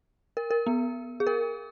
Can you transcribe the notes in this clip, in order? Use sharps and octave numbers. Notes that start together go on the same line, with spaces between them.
A#4
A#4
B3
G#4
A#4